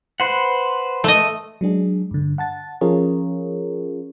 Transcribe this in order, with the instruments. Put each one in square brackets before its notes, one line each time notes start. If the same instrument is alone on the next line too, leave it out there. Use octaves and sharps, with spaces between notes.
[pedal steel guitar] B4 C5 F#5
[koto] A3 D#5
[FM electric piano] F#3 G#3 D4 G#4
G2 D3
F#5 A5 A6
F3 C#4 F4 G#4 A#4 C#5